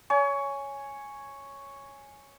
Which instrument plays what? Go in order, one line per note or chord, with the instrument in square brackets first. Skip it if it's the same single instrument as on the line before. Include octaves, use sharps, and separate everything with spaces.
[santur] C#5 G#5